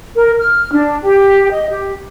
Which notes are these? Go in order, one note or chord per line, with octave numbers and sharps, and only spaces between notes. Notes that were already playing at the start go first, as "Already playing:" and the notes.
A#4
F6
D4
G4
D#5
G4